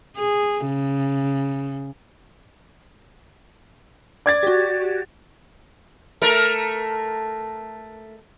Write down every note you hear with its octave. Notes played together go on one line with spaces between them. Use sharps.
G#4
C#3
D5 G#6 A6
F#4 G4
A3 A#4